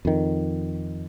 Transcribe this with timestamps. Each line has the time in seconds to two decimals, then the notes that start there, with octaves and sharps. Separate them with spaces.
0.05 F2 D#3